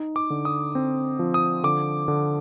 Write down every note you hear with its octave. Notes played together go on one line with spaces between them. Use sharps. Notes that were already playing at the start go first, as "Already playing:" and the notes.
Already playing: D#4
D6
D3
D#6
C4
F3
D#6
D3 D6
D3